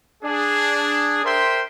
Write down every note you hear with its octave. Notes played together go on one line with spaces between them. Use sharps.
D4 G#4
A#4 C5 E5 G5 C6